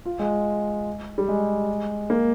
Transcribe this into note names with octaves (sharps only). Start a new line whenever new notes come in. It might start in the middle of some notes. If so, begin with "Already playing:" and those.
F4
G#3
G3
G#3
A#3